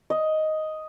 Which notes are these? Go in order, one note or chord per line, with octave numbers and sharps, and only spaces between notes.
D#5